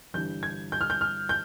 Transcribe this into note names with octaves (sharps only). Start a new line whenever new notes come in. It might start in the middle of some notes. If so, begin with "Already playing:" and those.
G1 G2 E3 G3 G6
G#6
G6
F6
G6
F6
G6